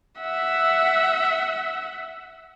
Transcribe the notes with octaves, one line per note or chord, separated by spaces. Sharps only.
E5 F#5